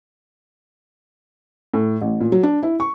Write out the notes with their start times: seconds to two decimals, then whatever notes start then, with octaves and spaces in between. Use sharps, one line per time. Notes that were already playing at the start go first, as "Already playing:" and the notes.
1.74 A2
2.02 A1
2.20 A#2
2.32 F#3
2.43 D4
2.63 E4
2.80 C#6